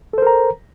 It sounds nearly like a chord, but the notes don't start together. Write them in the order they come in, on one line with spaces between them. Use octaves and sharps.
A4 C5 A#4 A#5